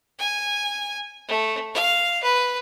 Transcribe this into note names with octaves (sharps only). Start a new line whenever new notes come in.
G#5
A3
F5
B4